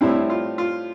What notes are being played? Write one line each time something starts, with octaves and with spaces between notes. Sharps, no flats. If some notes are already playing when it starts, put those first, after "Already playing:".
A2 G3 C4 E4
F4
F4